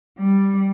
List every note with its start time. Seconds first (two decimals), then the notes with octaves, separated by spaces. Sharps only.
0.18 G3